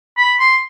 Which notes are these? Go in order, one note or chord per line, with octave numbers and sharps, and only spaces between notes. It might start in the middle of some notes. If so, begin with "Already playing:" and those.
B5
C6